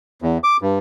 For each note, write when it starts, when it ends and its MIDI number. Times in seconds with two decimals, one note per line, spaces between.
0.22 0.38 40
0.44 0.57 86
0.62 0.79 43